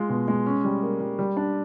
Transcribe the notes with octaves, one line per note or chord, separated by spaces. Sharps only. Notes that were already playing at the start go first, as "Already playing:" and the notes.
Already playing: G#3 F4
B2
G#3
C#4
G3
A#3
G3
G3
D4